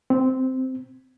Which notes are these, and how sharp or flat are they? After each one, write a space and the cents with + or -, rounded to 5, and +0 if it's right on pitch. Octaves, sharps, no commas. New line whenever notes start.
C4 -10